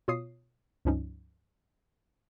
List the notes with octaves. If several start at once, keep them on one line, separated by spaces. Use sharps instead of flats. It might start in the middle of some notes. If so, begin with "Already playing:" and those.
B2 F4 C#5 D#6 C7
C#2 G2 F3 C#4 D#4